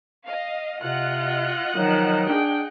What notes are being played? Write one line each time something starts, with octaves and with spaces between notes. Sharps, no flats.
D#5 F5
C3 F4 D#5 F#5 F#6
D#3 F3 F#3
D4 G#4 G5